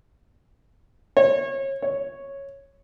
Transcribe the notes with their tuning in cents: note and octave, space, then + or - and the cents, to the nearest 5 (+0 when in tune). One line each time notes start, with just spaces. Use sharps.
C#5 -30
C#5 -5